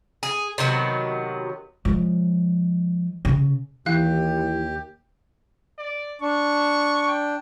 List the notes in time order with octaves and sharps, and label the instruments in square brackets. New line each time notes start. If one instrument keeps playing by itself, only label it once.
[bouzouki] G#4
C3 D#3 F#3 B3
[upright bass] F3 G#3
C#3
[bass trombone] D#2 [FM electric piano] E3 E4 [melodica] G4 [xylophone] F5 F#6
[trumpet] D5
[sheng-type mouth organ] D4 [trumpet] C#6
[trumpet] G5